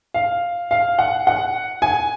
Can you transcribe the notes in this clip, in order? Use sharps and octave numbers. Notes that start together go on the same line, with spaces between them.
F5
F5
F#5
F#5
G#5